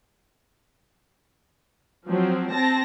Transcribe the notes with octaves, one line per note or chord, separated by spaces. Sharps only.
F3 F#3 C4
C4 A5 A#6